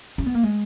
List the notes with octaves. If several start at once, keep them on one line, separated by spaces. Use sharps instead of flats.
C#4
B3
A#3
G#3